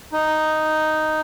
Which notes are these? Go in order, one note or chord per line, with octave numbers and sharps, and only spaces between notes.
D#4